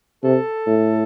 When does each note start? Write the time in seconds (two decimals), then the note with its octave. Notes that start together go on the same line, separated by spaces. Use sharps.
0.23 C3 A4
0.67 A2